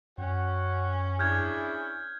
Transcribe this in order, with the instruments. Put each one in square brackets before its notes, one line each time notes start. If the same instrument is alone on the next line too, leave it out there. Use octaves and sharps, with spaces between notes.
[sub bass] F#2 [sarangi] C#4 [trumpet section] F#4 F#5 G5
[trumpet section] D4 E4 G#4 [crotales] F6 G6 G#6